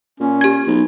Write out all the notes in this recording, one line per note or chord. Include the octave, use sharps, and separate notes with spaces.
A#2 C#4
G4 G#6
B1